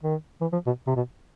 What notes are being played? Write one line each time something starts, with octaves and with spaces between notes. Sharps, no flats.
D#3
E3
F3
B2
C3
B2